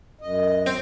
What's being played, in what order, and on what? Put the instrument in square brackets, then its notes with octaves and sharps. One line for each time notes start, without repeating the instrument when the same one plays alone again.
[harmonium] F#2 D#5
[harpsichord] C4